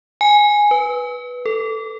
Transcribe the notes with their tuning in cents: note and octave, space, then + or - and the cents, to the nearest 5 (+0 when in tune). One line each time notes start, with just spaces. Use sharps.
G#5 +0
B4 -5
A4 +10